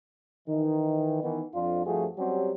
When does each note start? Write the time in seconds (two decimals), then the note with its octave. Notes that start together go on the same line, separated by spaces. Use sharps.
0.48 D#3 E3 D#4
1.23 D#3 E3 B3
1.54 F2 D4 F4
1.85 G2 F3 A3 C4 F#4 G#4
2.17 F#3 G3 C4 C#4 F#4 G4